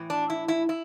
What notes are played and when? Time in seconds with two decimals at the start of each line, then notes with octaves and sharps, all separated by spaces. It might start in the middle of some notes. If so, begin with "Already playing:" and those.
Already playing: A2 E3
0.10 D4
0.30 E4
0.48 E4
0.69 E4